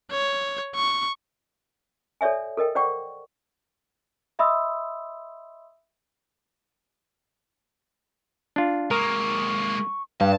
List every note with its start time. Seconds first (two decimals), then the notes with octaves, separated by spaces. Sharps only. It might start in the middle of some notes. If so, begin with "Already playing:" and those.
0.11 C#5
0.75 C#6
2.21 A4 C#5 D5 E5 G#5
2.57 A4 A#4 D#5 G5
2.75 C5 D5 F#5 G5 C#6 D6
4.39 D#5 E5 B5 C6 D#6 E6
8.56 D4 F4
8.91 G#3 A#3 A#4 C#6
10.21 G2 F5 A5